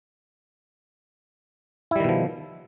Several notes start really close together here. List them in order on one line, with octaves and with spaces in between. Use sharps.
E4 G3 D#3 B2 F3